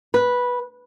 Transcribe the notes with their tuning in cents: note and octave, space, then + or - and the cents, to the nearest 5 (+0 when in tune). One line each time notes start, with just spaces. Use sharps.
B4 -10